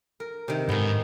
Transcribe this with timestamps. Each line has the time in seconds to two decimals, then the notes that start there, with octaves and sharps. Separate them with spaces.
0.20 A#4
0.48 C3 D#3
0.69 G#2 D#3 B3